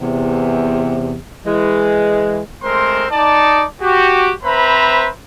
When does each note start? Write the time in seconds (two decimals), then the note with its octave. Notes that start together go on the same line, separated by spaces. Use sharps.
0.01 E2 C3
1.46 E3 G#3
2.63 G#3 A3 C4 A#4 C5 C6
3.11 D#4 D5 A5
3.82 F#4 G4
4.44 C4 B4 C5 E5 A#5 B5